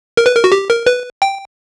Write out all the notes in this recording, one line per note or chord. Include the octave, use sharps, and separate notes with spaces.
A#4
B4
A#4
F#4
G4
A#4
B4
G5